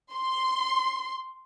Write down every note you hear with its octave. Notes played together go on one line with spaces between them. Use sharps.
C6